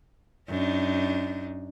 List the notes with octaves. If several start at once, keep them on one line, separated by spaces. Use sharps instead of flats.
F#2 D4 D#4